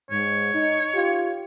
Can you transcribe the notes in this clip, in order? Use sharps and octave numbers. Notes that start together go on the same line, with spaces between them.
G#2 C#5
D#4
F4 G4